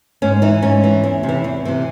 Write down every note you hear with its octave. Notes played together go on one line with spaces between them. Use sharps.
G#2 C#4
E3 D#4
G#2 C#4
E3
E2
C3
E3
E2
C3 E3